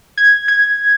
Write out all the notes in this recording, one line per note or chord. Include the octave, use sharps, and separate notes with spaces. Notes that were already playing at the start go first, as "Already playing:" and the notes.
G#6
G#6